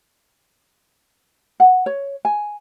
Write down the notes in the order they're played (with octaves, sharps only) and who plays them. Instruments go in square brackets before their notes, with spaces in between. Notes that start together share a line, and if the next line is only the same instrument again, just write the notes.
[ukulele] F#5
C#5
G#5